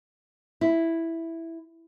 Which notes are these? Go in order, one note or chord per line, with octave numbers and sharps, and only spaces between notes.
E4